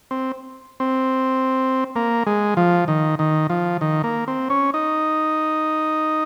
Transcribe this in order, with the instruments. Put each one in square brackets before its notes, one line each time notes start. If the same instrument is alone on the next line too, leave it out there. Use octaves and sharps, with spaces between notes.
[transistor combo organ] C4
C4
A#3
G#3
F3
D#3
D#3
F3
D#3
A#3
C4
C#4
D#4